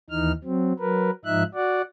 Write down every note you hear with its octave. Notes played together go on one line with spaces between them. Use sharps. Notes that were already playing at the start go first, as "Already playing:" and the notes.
D#2 E3 D#4 F6
F#3 C4
F#3 A#4 B4
G#2 F3 D#4 E5 F#6
F#4 D5 F#5